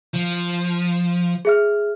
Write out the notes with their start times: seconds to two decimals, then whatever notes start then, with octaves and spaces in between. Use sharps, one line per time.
0.14 F3
1.45 G#4 E5 F6